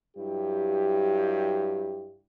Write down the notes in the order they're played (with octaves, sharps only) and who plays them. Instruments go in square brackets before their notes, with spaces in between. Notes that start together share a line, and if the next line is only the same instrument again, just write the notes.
[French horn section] G2 F#3 E4 G4